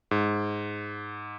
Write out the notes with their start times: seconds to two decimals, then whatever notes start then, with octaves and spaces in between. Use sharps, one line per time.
0.11 G#2